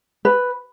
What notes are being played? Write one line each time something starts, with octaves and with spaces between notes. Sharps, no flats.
B4